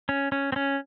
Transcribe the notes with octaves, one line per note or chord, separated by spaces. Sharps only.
C#4
C#4
C4
C#4